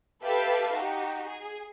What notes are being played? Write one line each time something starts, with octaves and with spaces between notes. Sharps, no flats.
G4 A4 B4 E5 F5 A5
D#4 F#4 G4
G#4